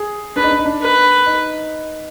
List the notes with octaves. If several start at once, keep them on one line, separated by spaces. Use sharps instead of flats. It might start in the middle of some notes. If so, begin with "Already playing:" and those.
Already playing: G#4
D4 B4
D#4
D4
D#4
D4
B4
D#4